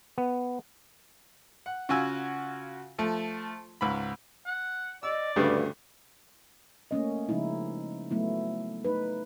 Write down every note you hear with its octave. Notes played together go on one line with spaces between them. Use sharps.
B3
F#5
C#3 F4 F#4 G#5 E6
F3 A3
C#2 G#2 B5
F#5
D5 D#5 E6
D2 G2 C#3 G3 B4
A3 A#3 C#4 D#5
C#3 F3 G#3 D#4 E4
F#3 A3 B3 E4
A3 D#4 B4